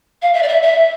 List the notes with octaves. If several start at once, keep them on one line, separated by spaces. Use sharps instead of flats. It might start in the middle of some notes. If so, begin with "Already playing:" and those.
F5
E5
D5
E5
E5